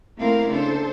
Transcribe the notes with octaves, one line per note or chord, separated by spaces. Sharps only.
A3 A#3 C4 E4 A#4 F5
C#3 D4 A4 C5